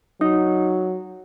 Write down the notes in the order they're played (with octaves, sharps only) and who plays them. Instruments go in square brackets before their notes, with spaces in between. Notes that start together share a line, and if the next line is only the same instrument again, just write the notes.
[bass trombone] F#3 [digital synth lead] D#4